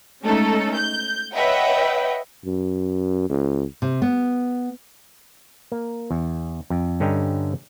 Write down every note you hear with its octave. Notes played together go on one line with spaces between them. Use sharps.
G#3 A3 C#4 D#4 A4
G6
B4 C#5 D#5 E5 F#5 G5
F#2
C#2
C3
B3
A#3
E2
F2
G2 D3 C#4 D#5 G5 A#5